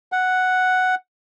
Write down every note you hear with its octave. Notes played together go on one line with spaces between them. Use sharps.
F#5